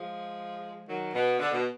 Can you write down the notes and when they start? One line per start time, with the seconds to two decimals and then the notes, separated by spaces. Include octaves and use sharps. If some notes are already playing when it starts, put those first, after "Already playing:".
Already playing: F3 G#3
0.88 D#3 F#3
1.14 B2
1.40 D3
1.52 B2